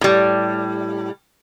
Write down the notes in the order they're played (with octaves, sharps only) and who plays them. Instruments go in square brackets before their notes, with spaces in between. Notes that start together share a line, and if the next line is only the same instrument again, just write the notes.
[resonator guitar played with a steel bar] A2 G3